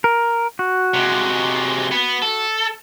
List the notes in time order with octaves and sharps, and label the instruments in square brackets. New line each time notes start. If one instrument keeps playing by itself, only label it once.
[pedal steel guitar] A#4
F#4
[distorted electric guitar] C3 G#3
B3
A4